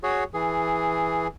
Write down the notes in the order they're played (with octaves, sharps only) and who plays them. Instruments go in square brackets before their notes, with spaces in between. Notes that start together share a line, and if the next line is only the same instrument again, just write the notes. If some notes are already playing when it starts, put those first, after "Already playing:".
[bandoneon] F#4 G#4 C#5
E3 G#4